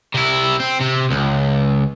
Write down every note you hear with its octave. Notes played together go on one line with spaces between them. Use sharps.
C3 E4
C4
C3
C#2